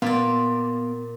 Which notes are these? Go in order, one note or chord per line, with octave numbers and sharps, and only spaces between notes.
A#2 B3 D5 F5